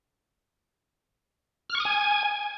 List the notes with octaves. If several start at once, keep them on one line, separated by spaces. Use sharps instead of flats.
F6
C#6
D#6
G#5